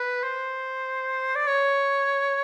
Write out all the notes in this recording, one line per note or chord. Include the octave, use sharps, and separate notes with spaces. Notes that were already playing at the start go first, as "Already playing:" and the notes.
Already playing: B4
C5
D5
C#5